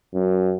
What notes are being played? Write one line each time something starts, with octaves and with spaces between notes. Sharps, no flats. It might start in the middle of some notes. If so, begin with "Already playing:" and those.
F#2